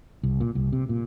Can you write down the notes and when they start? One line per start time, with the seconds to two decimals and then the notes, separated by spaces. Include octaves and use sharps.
0.23 C2
0.40 A#2
0.55 C2
0.72 C3
0.89 A#2